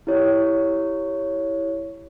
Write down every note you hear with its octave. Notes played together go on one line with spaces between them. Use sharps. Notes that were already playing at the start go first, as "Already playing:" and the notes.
E4 G4 C#5